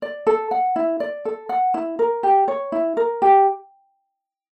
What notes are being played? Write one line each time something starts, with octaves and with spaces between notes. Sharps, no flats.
D5
A4
F#5
E4
D5
A4
F#5
E4
A#4
G4
C#5
E4
A#4
G4